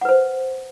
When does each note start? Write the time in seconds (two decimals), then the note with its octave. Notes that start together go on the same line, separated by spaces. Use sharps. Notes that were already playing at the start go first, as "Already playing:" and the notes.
0.01 F#5
0.05 B4
0.09 C5